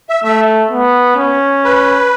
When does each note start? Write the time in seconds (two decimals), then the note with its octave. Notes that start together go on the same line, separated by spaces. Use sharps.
0.09 E5
0.24 A3 E5
0.71 B3
1.17 C#4
1.64 B4